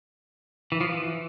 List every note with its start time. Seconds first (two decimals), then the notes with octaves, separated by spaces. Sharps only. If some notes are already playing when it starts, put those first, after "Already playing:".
0.72 E3
0.81 F3
0.88 E3